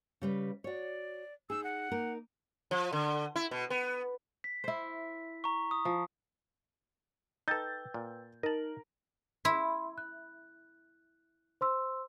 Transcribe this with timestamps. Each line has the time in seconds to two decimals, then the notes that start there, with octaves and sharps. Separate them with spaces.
0.21 C#3 G3 B4
0.64 F#4 C#5 D5
1.50 D#4 G#4 E6
1.64 F#5
1.91 A#3 D#4 A#4
2.71 F3
2.93 D3
3.36 E4
3.51 B2
3.70 B3
4.44 B6
4.64 E4 C5
5.44 A#5 C#6
5.71 D#6
5.85 F3
7.48 D#4 A4 B4 G5 E6 G6 A6
7.94 A#2
8.43 D#4 A#4 D#5 A5 F#7
9.45 E4 B5 C6
9.98 F#6
11.61 C5 C6 E6